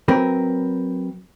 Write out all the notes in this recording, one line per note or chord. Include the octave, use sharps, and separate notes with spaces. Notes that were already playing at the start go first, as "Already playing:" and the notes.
F#3 C4 A#4 B4